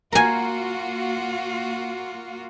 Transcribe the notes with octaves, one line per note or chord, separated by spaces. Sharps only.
A#3 F4 F#4 A#4 G#5